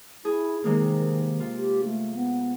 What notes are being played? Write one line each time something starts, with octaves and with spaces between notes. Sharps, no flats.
E4 G#4
C3 D#3 G#3 A#3
F4
G4
A3
B3